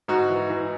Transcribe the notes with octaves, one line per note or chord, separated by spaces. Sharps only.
G#2 D#4 F#4
E3
E3